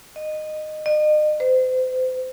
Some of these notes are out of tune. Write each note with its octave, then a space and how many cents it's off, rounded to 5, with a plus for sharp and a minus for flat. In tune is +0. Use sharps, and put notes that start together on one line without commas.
D#5 -15
D#5 -40
C5 -35